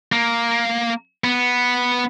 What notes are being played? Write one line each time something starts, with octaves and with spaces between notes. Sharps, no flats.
A#3
B3